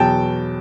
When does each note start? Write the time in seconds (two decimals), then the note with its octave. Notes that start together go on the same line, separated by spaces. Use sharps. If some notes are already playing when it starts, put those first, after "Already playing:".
Already playing: E2 B2 F#3 G5 A5